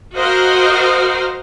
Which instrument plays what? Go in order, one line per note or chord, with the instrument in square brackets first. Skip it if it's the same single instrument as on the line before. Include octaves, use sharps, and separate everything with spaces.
[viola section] F#4 A#4 C5 D#5 F5